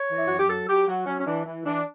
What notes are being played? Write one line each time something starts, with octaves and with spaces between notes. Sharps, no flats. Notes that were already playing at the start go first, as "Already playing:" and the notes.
Already playing: C#5
E3
E4
F#2 F#4
G4
F#3 A4
F#3 G4
F#3 F#4
F#3 C#4
C#4
E3 D4
E3
E3 D4